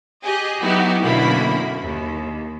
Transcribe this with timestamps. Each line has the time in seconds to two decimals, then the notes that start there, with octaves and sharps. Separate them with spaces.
0.25 G4 G#4 D#5
0.61 F#3 B3 D#4 E4 F#4 G4
1.02 F#2 B2 D3 A#3 E4 B5
1.83 D#2